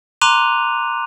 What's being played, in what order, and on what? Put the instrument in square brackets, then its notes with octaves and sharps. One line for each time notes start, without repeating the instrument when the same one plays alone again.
[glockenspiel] A#5 C6 D6 F#6 D#7 F7